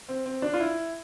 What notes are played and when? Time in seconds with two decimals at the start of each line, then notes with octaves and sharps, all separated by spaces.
0.09 C4
0.26 C4
0.42 D4
0.54 F4
0.60 E4